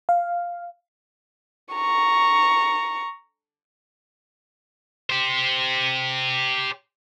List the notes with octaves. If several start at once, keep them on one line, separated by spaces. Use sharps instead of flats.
F5
A#5 C#6
G4 C5